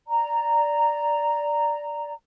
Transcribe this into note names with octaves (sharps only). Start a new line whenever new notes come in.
D5 A#5